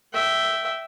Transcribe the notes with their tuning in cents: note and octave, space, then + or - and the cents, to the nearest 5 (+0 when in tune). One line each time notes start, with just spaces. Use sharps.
E5 +0 G5 -15